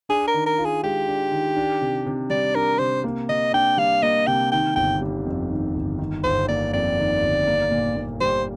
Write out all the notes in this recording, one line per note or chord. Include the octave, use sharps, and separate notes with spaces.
D4 G#4
A#4
D#3
A#4
F4
G#4
G#3 G4
D4
D#3
D4
C3
C3
G3 D5
D4 A#4
C3 C5
A#3
C3 D#5
D4 G5
G3 F5
A#3 D#5
C3 G5
D#3 G5
G1 G5
G3
F2
D#3
G1
D#3
G1 C5
A#3 D5
F2 D5
D#3
G1
A#3
A#2
A#2
G3 C5